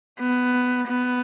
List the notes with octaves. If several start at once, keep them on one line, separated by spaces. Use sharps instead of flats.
B3
B3